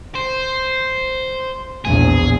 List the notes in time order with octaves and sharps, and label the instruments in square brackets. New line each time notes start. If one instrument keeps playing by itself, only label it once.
[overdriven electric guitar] C5
[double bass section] A#1 E2 [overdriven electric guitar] G#4